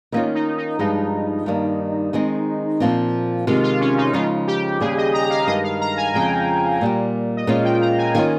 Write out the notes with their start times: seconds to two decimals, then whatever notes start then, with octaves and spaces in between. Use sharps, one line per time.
0.12 D#3 A#3 C#4 D#4 F4
0.35 D#4
0.58 D#4
0.79 G2 F3 G#3 D#4
1.46 G2 D#3 G3 A#3
2.13 D#3 G#3 C4 D#4
2.80 A#2 F3 C4
3.46 C3 D#3 G#3 F4
3.63 F4
3.80 C#4
3.97 D#4
4.13 C#3 F3 G#3 D#4 F4
4.47 G4
4.80 D#2 C#3 G3 G#4
4.97 D#5
5.14 A#5
5.30 F5
5.47 G2 D#3 G#3 D#5
5.64 F5
5.81 A#5
5.97 G#5
6.14 F2 C#3 F3 G#3 G5
6.81 A#2 G3 A#3
7.36 D#5
7.47 A#2 G#3 C#4 F4 F5
7.65 G5
7.81 A#5
7.98 G#5
8.14 D#3 A#3 C#4 F4 G#5